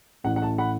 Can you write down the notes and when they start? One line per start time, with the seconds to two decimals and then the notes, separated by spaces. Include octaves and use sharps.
0.24 A1 A2 E3 F#5
0.36 F#5
0.42 A5
0.58 F#5 B5